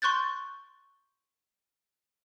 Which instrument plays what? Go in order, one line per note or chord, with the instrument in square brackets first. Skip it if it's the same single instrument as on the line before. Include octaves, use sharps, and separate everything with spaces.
[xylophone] C6 C#6 F#6 G6 A6